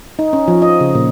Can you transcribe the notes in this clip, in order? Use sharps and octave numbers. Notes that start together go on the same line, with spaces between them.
D#4
C#4
F3
D#5
C#3
A#2